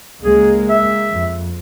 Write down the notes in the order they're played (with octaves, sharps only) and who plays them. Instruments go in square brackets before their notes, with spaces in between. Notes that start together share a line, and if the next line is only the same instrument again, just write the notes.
[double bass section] C#2 G#3 A#3 [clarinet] G#4
[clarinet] E5
[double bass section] F2